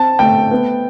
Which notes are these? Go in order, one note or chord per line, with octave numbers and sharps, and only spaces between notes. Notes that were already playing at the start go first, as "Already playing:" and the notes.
Already playing: C4 A5
A3 G5
B3